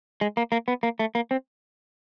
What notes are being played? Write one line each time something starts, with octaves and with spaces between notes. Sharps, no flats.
G#3
A#3
A#3
B3
A#3
A3
A#3
C4